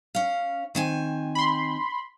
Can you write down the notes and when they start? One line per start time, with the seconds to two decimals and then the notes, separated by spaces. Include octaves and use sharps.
0.15 C#4 F5
0.75 D#3 C4 G#5
1.35 B5 C6